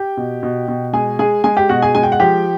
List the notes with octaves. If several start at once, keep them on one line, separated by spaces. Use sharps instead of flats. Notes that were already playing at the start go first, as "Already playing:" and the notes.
Already playing: G4 G5
B2
B2
B2
G#3 G#4 G#5
G#3 G#4 G#5
G#3 G#4 G#5
G4 G5
B2 F#4 F#5
G#4 G#5
G#3 G#5
G5
F#5
F3 G4 G5